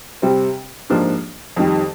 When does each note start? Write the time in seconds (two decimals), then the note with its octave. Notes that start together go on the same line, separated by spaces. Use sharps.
0.22 C3 G3 C4
0.90 G#2 F3 A#3 D4 G4
1.56 F2 D#3 G3